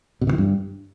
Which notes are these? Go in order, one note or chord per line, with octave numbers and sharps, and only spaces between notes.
B2
C3
E3
G2